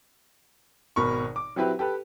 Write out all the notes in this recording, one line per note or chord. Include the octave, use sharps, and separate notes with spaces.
G#1 B2 A#4 B5 C#6
D6
F#3 C4 E4 G4 B4
G4 A4 B4